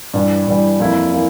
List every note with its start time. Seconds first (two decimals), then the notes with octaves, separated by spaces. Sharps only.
0.14 G2 E3 G3
0.47 G2 E3 G3
0.80 F2 E3 A#3 E4
1.12 E3 A#3 E4